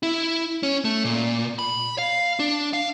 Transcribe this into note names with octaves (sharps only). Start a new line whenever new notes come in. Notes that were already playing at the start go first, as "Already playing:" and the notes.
E4
C#4
A3
A#2
B5
F5
D4
F5